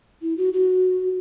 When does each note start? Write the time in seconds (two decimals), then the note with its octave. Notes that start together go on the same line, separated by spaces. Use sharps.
0.22 E4
0.38 F#4
0.53 F#4